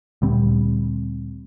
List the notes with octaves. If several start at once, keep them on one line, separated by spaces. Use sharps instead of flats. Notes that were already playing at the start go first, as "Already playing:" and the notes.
D2 A#2 G3 C4